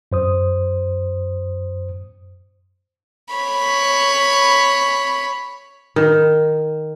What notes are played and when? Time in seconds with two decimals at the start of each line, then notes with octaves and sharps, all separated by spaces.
0.12 F#2 C5 D#6
3.34 C#5 B5
5.96 D#3